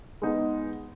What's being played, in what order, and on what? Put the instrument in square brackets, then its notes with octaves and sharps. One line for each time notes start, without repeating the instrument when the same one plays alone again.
[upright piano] G#3 B3 D#4